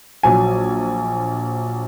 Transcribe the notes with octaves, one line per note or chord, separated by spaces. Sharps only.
A#1 F#3 G#5